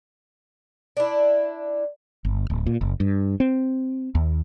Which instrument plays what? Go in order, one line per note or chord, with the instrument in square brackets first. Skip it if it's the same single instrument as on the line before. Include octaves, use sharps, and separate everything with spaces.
[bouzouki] D4 E4
[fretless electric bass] G1
D1
A#2
F#1
G2
C4
D#2